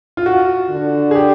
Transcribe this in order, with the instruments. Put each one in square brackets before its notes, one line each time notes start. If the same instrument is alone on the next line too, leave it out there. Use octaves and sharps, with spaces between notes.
[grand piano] F4
F#4
[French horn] D3
[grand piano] G#4
G4